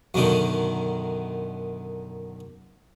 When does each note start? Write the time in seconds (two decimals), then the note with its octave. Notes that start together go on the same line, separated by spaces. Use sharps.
0.14 F#2 B2 D3 D#3